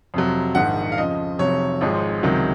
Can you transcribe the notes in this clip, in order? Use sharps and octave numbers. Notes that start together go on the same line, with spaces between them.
F2 C3 F#3
A#1 G#2 D#3 F#5
F5
F2 C#3 F3 D#5
F1 F2 C3 F#3 C#5
G#1 G#2 F3 G#3
C#2 C3 D#3 F#3